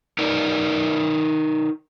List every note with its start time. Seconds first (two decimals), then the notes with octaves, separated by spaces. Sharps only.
0.19 D#4 A#4 B4 D5